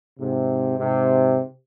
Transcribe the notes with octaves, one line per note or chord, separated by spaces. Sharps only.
G#2 C3
G#2 C3